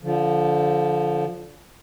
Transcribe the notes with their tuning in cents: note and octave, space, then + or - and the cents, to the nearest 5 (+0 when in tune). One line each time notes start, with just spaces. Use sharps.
D3 -20 F3 +0